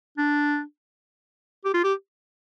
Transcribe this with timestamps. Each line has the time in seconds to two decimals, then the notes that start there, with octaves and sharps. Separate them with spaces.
0.18 D4
1.65 G4
1.74 F4
1.84 G4